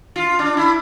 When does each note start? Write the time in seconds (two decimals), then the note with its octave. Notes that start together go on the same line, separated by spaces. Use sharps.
0.16 F4
0.39 D4
0.57 E4